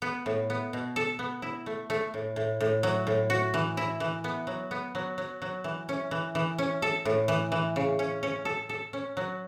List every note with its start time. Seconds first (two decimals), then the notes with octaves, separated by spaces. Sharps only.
0.02 B3
0.26 A2
0.50 B3
0.73 B2
0.96 A4
1.19 B3
1.42 E4
1.66 A3
1.90 A3
2.14 A2
2.36 A2
2.60 A2
2.83 F#3
3.07 A2
3.30 F#4
3.54 E3
3.77 E4
4.00 E3
4.24 B3
4.47 F#3
4.71 B3
4.95 F#3
5.18 F#3
5.42 F#3
5.64 E3
5.89 C#4
6.11 E3
6.35 E3
6.58 C#4
6.82 A4
7.05 A2
7.28 E3
7.52 E3
7.76 C#3
7.99 C#4
8.23 C#4
8.45 A4
8.69 A4
8.93 C#4
9.17 F#3